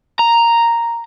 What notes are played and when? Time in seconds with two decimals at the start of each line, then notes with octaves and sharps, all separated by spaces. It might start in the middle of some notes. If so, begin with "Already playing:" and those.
0.19 A#5